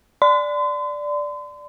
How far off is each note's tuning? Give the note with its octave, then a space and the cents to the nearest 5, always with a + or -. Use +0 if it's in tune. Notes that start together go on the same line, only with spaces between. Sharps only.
D5 +0 C6 -40